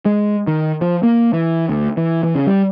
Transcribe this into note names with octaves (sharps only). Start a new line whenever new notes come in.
G#3
D#3
F3
A#3
E3
D2
E3
E3
C#3
G3